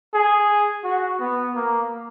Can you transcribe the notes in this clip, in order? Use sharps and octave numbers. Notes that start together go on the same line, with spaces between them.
G#4
F#4
B3
A#3